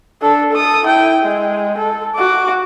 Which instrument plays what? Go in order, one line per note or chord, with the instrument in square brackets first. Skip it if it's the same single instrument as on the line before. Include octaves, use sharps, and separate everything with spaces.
[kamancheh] D4 A4
A4 D#6
E4 G5
G#3
A4
F#4 D6